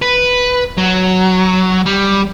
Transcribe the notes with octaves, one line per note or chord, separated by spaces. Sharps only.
B4
F#3
G3